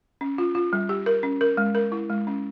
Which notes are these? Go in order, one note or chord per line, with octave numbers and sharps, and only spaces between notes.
C#4
F4
F4
G3
G4
A#4
C#4
A#4
G#3
A#4
E4
G#3
C#4